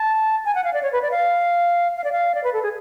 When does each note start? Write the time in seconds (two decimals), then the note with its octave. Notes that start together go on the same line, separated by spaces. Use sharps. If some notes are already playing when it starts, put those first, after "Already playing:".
Already playing: A5
0.45 G#5
0.55 F#5
0.64 F5
0.73 D5
0.83 C#5
0.92 B4
1.02 D5
1.11 F5
1.97 F5
2.04 D5
2.12 F5
2.35 D5
2.44 B4
2.53 A4
2.63 G#4